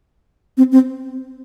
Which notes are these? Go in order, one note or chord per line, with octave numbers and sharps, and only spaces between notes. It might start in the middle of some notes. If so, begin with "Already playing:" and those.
C4
C4